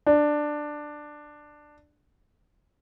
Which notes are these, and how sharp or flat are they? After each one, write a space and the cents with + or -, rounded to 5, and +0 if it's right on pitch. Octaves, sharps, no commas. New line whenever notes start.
D4 +10